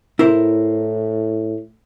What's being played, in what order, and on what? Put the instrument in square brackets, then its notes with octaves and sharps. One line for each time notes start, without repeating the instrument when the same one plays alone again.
[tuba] A2 [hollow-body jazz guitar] E4 A#4 C5